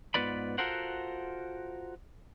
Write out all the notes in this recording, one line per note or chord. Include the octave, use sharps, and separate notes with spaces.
G#2 B3 F4 B4 D5 B5
F4 F#4 A4 A#4 C5 F#5